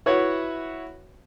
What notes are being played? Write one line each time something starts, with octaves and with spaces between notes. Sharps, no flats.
E4 F#4 B4 C#5 E5 F#5